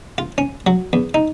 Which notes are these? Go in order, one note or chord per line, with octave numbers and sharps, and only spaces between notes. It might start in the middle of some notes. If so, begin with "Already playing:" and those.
F4
C#4
F#3
E2
D#4